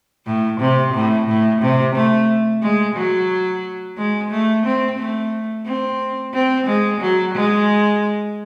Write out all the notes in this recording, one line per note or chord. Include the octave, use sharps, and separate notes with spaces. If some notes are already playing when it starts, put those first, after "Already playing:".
A2
C3
A2
A2
C3
A3
G#3
F#3
G#3
A3
C4
A3
C4
C4
G#3
F#3
G#3